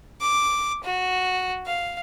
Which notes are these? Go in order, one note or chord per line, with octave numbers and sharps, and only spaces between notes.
D6
F#4
F5